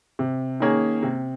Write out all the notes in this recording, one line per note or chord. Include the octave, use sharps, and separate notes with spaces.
C3
D#3 A#3 C#4 G#4
C3